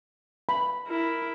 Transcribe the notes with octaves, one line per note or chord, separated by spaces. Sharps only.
B5
E4 A#4